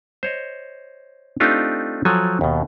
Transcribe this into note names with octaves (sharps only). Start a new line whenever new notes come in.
C5 C#5 D#5
A3 C4 D4 D#4 F4 G4
F3 F#3 A4 G#5
D#2 B2